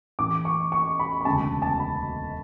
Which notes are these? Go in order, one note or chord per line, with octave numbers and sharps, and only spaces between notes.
A1 A2 E3 D6
C#6
C#6
B5
B5
E1 D2 C#3 A5
A5
B5